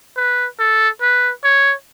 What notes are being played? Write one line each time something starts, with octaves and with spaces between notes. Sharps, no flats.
B4
A4
B4
C#5